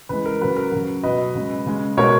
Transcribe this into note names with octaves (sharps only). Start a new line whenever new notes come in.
C#3 E3 G#3 B4
A#4
C#3 F#3 B4
A#4
C#3 F#3
B2 F#3 B4 D#5
C#3 G#3
C#3 G#3
B2 G#3 A#4 C#5